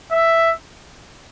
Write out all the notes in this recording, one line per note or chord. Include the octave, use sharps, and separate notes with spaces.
E5